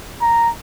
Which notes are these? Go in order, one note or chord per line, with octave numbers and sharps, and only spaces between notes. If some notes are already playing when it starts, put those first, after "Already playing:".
A#5